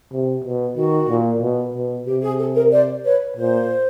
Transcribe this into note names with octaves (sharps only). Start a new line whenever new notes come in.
C3
B2
D#3 F#4
A#2
B2
B2
C3 G4
G#4
A4
A#4
C5 D5
B4 C#5
A#2 C5